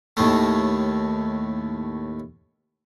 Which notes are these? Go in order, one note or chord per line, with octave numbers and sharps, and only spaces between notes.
D#2 A2 A3